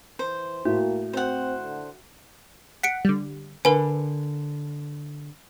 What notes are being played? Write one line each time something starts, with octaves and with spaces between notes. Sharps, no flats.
E3 C5
A2 A#3 F#4
C4 C5 F#5
D3
F#5 B6 C#7 D7
D3 G3
D3 A#4 B4 G#5